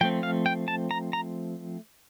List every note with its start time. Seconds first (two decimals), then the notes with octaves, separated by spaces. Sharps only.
0.01 F3 A3 C4 G5
0.23 F5
0.46 G5
0.68 A5
0.91 A#5
1.13 A#5